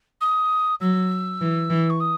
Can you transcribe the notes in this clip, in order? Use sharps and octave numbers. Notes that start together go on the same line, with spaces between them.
D#6
F#3 E6
E3
E3
C#6
D#6